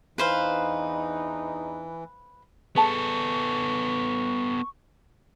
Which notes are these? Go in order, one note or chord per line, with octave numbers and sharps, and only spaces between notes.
E2 E3 D4 D#4 B4 C5 F5
B3 G#4 A4 A5 C#6